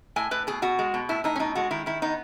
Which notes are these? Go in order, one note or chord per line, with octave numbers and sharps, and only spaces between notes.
A2 G#5
A2 B4
B2 G#4
B2 F#4
G#3
B2
A2 E4
A2 D#4
C#4
B2 D#4
G#3 F#4
D#3 E4
D#3 E4
B3 D#4